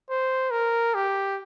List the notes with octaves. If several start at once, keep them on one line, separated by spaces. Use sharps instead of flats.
C5
A#4
G4